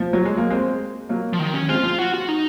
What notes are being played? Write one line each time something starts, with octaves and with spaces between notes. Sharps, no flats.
F3
F#3
G#3
A#3
G#3 C4
F#3 A#3
F3
D#3
C#4
G#3 C4 F4
F3
F#4
F#4
D#4